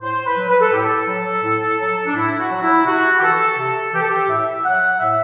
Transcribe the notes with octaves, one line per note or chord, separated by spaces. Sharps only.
A2 C5
B4
F#3
B4
A4
A2 G4
A4
F#3
A2
F#3
D4
A2 E4
F#4
F#3
E4
C3 F#4
G4
E3 A4
C3 A4
E3 G4
A4
G4
A2 E5
F#3 F#5
A2 E5